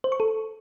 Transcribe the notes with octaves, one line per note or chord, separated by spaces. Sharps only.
C5
C#6
A4